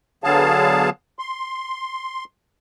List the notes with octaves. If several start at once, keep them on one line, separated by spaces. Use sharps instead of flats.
D3 F#3 B3 G#4 F5 A5
C6